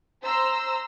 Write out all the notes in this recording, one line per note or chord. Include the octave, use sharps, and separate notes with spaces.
C5 A#5 C6 E6